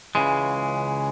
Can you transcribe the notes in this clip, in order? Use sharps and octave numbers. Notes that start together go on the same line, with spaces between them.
C#2 C#3 E3 G#3